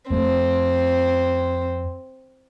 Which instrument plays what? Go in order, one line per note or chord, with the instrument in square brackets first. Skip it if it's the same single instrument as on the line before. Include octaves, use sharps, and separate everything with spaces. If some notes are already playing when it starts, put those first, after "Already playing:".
[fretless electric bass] F2 A3 [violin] C4